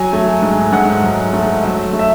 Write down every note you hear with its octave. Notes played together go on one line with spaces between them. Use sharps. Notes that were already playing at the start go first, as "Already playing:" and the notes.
Already playing: F#3 G#5
A3
G#2
G#2 F#5
F#3
A3
F#3 E5
A3
E5